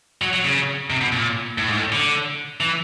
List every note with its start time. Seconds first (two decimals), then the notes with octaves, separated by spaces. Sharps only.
0.22 F#3
0.33 F#3
0.45 C#3
0.90 C3
1.01 B2
1.12 A#2
1.58 A2
1.68 G#2
1.77 A2
1.92 D3
2.60 E3